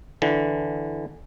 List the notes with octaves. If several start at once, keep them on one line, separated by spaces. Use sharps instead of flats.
D3 E3